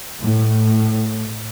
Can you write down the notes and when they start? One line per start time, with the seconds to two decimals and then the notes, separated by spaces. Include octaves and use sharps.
0.22 A2